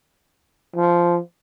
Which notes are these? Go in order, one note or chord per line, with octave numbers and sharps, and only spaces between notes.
F3